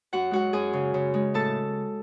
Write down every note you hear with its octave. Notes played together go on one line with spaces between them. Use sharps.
F#2 F#4 F#5
G#3 F#4 F#5
F#2 G#4 G#5
C#3
C#3
G#3
A2 A4 A5